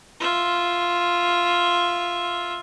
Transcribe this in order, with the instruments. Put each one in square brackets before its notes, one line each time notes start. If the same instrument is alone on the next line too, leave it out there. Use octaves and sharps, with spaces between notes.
[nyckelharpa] F4 E5